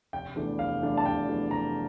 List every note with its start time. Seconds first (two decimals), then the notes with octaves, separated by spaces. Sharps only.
0.13 F1 G5
0.36 E2 E3 A3 D4
0.59 F1 F5
0.82 E2 E3 A3 D4
0.97 A5
1.06 F1 G5
1.29 E2 E3 A3 D4
1.51 F1 A#5